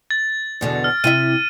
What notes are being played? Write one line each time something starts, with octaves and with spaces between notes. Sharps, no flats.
A6
E2 B2 D3
F6
C3 E4 E5 D#7